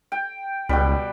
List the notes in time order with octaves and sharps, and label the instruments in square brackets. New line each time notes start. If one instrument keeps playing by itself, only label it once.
[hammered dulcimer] G5
[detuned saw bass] C#2 [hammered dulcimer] B2 G3